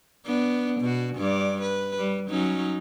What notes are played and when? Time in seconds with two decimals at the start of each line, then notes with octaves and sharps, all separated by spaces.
0.26 B3 D4
0.80 B2 F#4
1.16 G2 D5
1.62 B4
1.98 G3
2.30 F#3 C#4 D#4